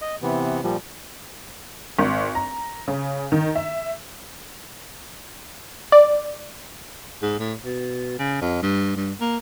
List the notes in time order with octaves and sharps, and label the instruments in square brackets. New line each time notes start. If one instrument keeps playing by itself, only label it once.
[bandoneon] D#5
C3 E3 B3
A#2 F3 G3
[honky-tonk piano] G#1
A#5
C#3
D#3
E5
[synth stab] D5
[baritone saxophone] G#2
A2
B2
C#3
F2
G2
G2
A#3